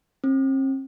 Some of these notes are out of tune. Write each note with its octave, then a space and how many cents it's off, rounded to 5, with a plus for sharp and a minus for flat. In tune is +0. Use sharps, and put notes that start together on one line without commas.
C4 +45